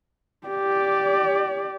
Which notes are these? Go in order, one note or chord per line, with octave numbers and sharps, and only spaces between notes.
G4 D5